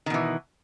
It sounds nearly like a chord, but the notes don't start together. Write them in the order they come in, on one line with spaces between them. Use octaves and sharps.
D#3 B2 E3